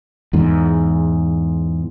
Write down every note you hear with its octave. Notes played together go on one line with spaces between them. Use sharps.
E2 G#2